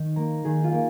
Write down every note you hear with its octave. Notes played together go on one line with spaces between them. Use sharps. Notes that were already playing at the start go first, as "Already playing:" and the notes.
Already playing: D#3
A#3 A#5
D#3 G#4
F4
A#3